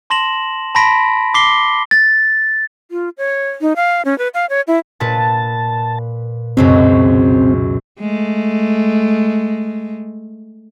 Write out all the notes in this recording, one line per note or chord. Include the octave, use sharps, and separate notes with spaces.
A5 C6 A#6 E7 F#7
A5 B5 C6 A#6 B6 D7
D6 B6 C7 G7
A6
F4
C#5
D#4
F5
C#4
B4
F5
C#5
E4
A#2 B4 A5
C#2 F#2 B2 C4
G#3 A3